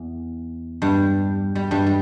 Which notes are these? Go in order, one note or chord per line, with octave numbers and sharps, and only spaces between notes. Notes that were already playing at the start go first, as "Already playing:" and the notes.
Already playing: E2
G2 G3
G3
G2 G3
G3